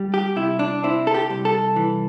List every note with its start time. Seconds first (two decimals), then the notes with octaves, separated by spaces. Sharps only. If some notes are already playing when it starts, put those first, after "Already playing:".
Already playing: G3
0.14 G4
0.36 C3 E4
0.59 D4
0.84 C4 E4
1.07 A4
1.14 G4
1.30 C2
1.45 A4
1.76 E3